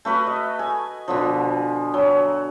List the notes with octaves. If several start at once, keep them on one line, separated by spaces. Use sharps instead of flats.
A3 F#4 B4 B5
D#5
G#5
B2 D3 F3
F#3